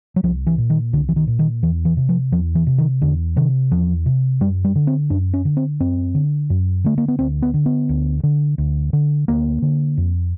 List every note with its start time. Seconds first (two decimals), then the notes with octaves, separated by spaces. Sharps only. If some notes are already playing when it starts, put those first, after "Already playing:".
0.16 F#3
0.23 C2 F3
0.47 E3
0.58 A#2
0.70 D#3
0.93 C2 D3
1.09 E3
1.16 D#3
1.27 A#2
1.39 D#3
1.63 E2 E3
1.85 E3
1.97 C3
2.09 F3
2.32 E2 F3
2.55 E3
2.67 C3
2.78 D#3
3.02 E2 D3
3.36 C3 D#3
3.71 E2 F3
4.06 C3
4.41 F#2 G3
4.64 G3
4.75 D3
4.87 C4
5.10 F#2 D4
5.34 C#4
5.45 D3
5.57 C4
5.80 F#2 C4
6.15 D3
6.50 F#2
6.84 D3 A3
6.98 A#3
7.08 B3
7.19 D2 C4
7.42 B3
7.54 D3
7.66 B3
7.89 D2
8.23 D3
8.58 D2
8.93 D3
9.28 D2 A#3
9.62 D3
9.97 F2